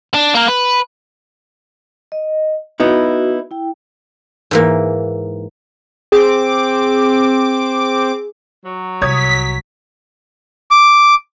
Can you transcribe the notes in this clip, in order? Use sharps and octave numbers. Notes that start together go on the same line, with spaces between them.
D4
A#3 A#4
B4
D#5
B3 D#4 E4 F#4
E4 G5
G#2 E3 A#3
C4 G#4 D6
F#3
C2 C#5 D#6 G#6 B6
D6